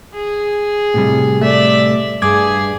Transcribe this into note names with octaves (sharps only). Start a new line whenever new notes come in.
G#4
A2 C3 G3
A3 D5 E5
G2 G#4 D6 G#6